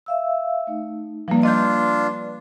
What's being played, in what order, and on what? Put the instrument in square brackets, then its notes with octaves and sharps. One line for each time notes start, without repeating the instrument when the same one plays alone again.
[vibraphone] E5 F5 E6
A3 D#4
[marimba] F3 G3 A#3 [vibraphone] B4 D5
[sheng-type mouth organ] D4 F4 [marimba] D#5 G6